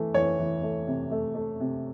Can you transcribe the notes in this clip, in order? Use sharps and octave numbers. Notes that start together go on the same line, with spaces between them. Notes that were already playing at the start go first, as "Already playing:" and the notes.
Already playing: E3 A3
E3 C#5
E3
A3
C3
A3
A3
C3